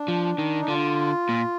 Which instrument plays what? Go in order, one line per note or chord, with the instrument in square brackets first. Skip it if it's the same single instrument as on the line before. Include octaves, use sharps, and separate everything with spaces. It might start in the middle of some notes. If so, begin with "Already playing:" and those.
Already playing: [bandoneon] D4
[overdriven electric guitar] F3
D#3
[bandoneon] D#4
[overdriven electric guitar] D3 [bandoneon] F4
[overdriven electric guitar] A#2